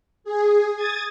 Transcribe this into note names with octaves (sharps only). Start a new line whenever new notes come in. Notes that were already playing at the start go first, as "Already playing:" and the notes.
G#4
D#6 G#6 A6